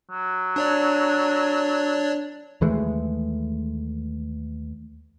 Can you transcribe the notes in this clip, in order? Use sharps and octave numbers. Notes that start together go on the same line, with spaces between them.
F#3
D4 C#5 D5
D#2 E3 G#3 A3